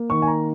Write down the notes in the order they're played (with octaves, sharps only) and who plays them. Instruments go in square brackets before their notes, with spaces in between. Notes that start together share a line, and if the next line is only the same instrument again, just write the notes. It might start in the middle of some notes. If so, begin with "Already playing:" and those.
Already playing: [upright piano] A#3
D#3 C#6
G#5
A#5